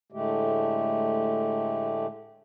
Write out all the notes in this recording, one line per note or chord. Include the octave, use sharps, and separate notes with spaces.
A2 D3 G#3 A3 G4